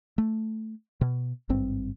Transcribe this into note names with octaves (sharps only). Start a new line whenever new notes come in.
A3
B2
G#1 G2 C4